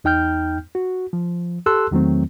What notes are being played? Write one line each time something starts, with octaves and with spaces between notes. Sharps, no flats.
E2 D#4 G5 F6 G6
F#4
F3
G4 A4 A5 C6 E6 F#6
E2 D#3 F#3 A3 C4